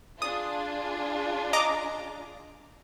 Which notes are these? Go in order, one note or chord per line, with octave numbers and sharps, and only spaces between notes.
D4 F4 G#4 D#6
D#5 A#5 D6